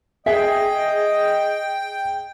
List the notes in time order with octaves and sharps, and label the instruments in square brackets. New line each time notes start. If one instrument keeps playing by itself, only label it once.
[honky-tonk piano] G#4 [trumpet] D#5 [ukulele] E5 [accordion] G5